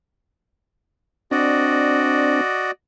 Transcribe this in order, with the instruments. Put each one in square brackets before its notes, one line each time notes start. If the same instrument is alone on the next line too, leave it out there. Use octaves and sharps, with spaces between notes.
[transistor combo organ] C4 D4 [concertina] F#4 D5 D#5